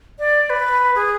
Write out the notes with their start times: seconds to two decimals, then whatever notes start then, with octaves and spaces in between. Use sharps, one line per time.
0.19 D5
0.50 B4
0.95 G#4